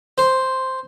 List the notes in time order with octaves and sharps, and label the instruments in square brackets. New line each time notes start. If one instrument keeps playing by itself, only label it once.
[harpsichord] C5